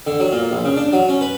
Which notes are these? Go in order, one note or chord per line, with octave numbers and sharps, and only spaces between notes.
D3
F#3
A#2
A#1
C#3
D4
F#3
C#4
B4